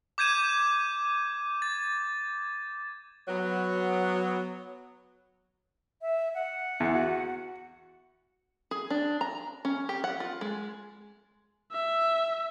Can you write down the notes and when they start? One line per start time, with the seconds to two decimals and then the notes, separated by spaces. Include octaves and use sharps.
0.18 D6 G6 G#6 D#7 E7
1.62 A6
3.28 F#3 B3
6.01 E5
6.34 F#5
6.80 E2
6.95 F#4
8.71 G#4
8.90 D4
9.21 A#5
9.65 C#4
9.89 G4
10.04 F#5
10.20 F4
10.41 G#3
11.72 E5